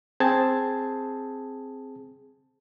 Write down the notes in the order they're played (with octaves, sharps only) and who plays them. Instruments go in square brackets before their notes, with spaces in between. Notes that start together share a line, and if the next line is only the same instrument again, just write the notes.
[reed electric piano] C4 G#4 A5 G#6